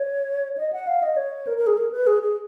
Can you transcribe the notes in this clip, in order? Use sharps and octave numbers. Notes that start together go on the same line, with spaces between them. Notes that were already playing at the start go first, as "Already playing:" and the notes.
Already playing: C#5
D#5
F#5
F5
D#5
C#5
A#4
A#4
G#4
A#4
B4
G#4
G#4